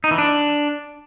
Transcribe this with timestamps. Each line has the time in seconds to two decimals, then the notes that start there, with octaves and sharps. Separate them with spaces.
0.04 D#4
0.11 E3
0.18 D4